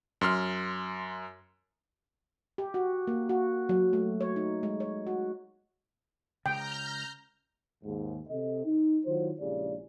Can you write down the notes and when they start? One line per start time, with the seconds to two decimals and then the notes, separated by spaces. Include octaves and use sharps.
0.21 F#2 C6 F6
2.58 G4
2.74 F#4
3.07 A#3
3.29 F#4
3.69 F#3
3.93 A3
4.21 C#5
4.36 D#4
4.63 G#3
4.80 C#5
5.07 F#4
6.46 C#3 G#3 G5 A#5 F6 G6
7.84 D#2 G#2
8.29 C3 A4 D#5
8.66 D#4
9.06 D#3 F#3 E4 F4 C5
9.40 A#1 C#3 G#3 E4 G4 D5